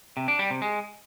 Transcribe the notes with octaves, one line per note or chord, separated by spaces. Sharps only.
C3
D4
G3
C3
G#3